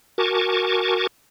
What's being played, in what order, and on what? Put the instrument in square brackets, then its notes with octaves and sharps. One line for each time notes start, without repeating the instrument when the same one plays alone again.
[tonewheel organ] F#4 A#4 G#5 A5 C#6 D6